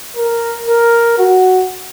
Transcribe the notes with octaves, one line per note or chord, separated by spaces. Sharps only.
A#4
A#4
F#4